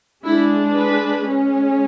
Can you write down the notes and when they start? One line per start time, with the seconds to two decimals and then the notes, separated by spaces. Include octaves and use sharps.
0.24 G#3 D4 E4
0.75 B4
1.25 G#3 C#4